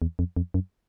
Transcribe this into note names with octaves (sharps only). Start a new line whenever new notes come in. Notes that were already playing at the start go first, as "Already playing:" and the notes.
E2
F2
F2
F#2